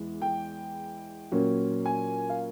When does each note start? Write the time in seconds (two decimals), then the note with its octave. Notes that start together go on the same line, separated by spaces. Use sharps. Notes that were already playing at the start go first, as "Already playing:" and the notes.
Already playing: E2 E3 G#3
0.22 G5
1.32 A#2 F#3 A#3 C#4
1.86 G#5
2.30 F5